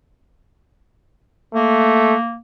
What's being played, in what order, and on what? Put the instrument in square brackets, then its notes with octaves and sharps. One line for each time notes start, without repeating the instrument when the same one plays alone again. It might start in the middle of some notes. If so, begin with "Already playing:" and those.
[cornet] A3 [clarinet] A#3